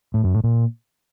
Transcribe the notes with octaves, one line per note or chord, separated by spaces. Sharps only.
A2
F#2
A2
A#2